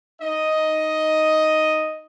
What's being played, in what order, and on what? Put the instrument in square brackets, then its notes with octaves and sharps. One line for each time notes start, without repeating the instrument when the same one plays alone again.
[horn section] D#4 D#5